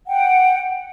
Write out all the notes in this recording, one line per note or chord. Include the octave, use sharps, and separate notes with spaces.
F#5 G5